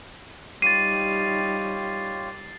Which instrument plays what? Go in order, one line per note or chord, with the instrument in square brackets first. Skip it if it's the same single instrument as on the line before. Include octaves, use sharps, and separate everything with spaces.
[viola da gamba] G3 D#4 [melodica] F4 G4 C#5 [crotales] A6 C7 [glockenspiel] D#7